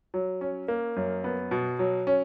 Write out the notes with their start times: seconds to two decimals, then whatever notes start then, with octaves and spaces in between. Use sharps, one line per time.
0.14 F#3
0.41 C#4
0.68 A#3
0.96 F#2
1.24 B3
1.51 B2
1.79 F#3
2.07 C#4